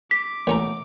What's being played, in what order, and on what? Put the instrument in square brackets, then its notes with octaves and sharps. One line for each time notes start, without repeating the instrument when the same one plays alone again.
[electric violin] D6 [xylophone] B6
[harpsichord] A1 C#4 A#5 [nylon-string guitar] B2 A3